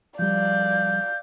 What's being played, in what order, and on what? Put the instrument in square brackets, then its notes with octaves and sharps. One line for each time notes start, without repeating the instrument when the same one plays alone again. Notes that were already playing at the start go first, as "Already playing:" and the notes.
[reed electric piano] F3 G3 [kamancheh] D5 F5 [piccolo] G6